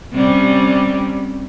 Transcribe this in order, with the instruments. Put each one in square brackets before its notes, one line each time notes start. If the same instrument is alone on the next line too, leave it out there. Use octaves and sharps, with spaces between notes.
[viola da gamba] C3 G3 C#4